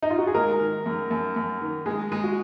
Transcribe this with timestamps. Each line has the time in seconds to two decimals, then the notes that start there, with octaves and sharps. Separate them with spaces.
0.02 D#4
0.10 F4
0.18 F#4
0.27 G#4
0.34 G#3 A#4
0.59 D#3
0.86 F#2
1.10 F#2
1.36 F#2
1.61 D#3
1.86 G#3 G#4
2.12 G#3
2.24 F#4